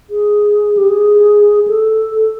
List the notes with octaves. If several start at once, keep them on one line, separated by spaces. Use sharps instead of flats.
G#4
G4
G#4
A4